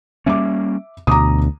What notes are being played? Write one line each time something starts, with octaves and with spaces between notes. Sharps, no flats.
G3 A#3 C#4 E5 D6
D2 B2 A#5 D6 D#6